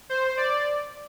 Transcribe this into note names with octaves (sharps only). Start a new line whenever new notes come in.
C5
D5